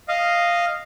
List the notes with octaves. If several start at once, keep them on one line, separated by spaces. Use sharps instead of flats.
D#5 F5